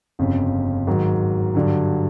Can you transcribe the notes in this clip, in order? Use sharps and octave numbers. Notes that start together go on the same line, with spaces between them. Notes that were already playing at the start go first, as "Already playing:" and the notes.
G1 F2 C#3
G#2 D#3 F#3
G2 D3 F#3